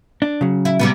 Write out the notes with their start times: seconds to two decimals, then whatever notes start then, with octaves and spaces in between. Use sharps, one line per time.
0.22 D4
0.41 C#3 F#3
0.65 E4
0.79 C3 G3 B3